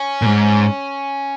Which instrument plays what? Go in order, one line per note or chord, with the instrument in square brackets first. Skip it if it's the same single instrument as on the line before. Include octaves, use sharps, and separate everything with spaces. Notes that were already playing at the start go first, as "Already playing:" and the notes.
Already playing: [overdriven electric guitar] C#4
[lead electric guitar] A#2
G#2